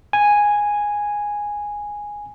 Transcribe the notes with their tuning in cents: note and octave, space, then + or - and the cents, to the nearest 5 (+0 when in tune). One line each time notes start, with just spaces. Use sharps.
G#5 -5